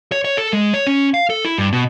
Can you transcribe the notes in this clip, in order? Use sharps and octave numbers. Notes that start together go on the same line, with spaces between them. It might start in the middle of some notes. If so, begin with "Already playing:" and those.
C#5
C#5
A4
G#3
C#5
C#4
F5
A4
E4
G2
B2